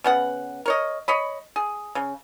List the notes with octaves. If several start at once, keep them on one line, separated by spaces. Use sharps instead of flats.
C#3 B3 F#5
A#4 C#5 D#5
C#5 D#5 B5
G#4
C#3